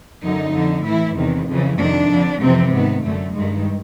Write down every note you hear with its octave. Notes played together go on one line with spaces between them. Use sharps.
F#2 D3 D#4
F2 D3
A2 E3 E4
E2 C3 D#3
F2 C#3 E3
F2 C3 D#3 D4
F2 D3
F2 C3 E3 C4
G#2 D#3 B3
F#2 D3 A3
G2 D#3 G#3